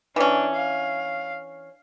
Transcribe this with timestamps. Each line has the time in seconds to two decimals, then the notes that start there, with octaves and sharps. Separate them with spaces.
0.16 E3 C#4 D4
0.56 F5